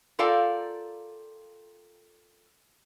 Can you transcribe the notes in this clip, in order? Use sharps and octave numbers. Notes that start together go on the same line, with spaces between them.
F4 A4 A#4 D5 F5 G5